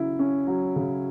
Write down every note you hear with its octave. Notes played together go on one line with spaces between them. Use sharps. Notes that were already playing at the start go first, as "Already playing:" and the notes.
Already playing: C#3 F#3 E4
C#4
F#3
C#3